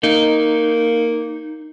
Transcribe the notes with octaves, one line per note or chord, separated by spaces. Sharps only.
A#3 D#4